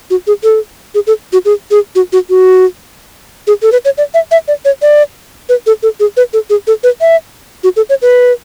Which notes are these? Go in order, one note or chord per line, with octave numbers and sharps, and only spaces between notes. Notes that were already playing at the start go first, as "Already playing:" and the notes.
F#4
G#4
A4
G#4
A4
F#4
G#4
G#4
F#4
F#4
F#4
G#4
A4
B4
C#5
D5
E5
E5
D5
C#5
D5
B4
A4
A4
G#4
B4
A4
G#4
A4
B4
E5
F#4
A4
C#5
B4